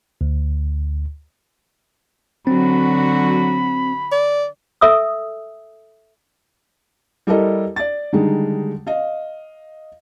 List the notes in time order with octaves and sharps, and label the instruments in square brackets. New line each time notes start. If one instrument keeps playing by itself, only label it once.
[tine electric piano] D2
[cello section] D3 F#3 F#4 [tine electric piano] C4 [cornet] B5
[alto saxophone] D5
[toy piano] A4 E5 D#6 E6
[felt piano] G3 E4 G4 A4 A#4 D#5
D5 A6
D3 D#3 G3 G#3 D#4
D#5 F5